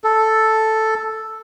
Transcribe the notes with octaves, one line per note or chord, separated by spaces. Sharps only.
A4